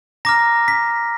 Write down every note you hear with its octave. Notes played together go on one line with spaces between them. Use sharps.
A#5 D6 F6 A#6
B6